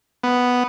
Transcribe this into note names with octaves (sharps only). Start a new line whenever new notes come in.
B3